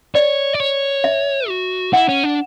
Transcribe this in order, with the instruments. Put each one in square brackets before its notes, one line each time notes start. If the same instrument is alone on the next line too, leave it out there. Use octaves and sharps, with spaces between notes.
[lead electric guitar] C#5 [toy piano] D5
[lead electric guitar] D5
C#5
[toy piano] E5
[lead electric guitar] F#4
[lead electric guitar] E4 [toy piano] F#5
[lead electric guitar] C#4
D4